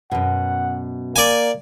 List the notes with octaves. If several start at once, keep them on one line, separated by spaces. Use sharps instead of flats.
F#2 B2 F#5
A#3 D5 G#5